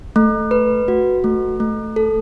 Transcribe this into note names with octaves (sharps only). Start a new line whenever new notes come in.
A3
B4
F#4
A3
A3
A4